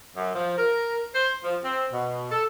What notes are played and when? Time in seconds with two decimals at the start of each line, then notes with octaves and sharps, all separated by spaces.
0.16 F#2
0.35 F3
0.58 A#4
1.14 C5
1.44 F3
1.64 C4
1.93 B2
2.31 A4